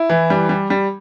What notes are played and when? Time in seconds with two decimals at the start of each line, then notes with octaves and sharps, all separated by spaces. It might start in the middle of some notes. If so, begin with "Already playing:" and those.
Already playing: E4
0.10 E3
0.30 G3
0.49 G3
0.70 G3